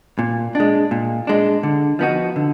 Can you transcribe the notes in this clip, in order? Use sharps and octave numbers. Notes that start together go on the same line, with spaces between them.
A#2
G#3 D4
A#2
G#3 D4
D3
F3 B3 D#4 F#4
D3